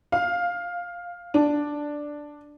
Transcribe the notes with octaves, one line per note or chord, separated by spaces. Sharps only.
F5
D4